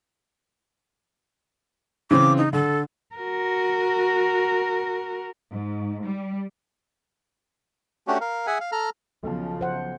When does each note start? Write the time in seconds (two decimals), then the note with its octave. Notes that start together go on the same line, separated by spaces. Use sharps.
2.11 C#3 E3 C4 D6
2.37 D#4
2.53 D3 A4
3.16 F#4 A#4
5.51 G#2
6.04 G3
8.07 A3 C#4 D4 F#4 G4
8.21 A#4 F5
8.47 G#4 E5 F#5 G#5
8.61 F5
8.72 A4 A#5 F6
9.23 B1 C#3 F3 A5
9.61 C5 F#5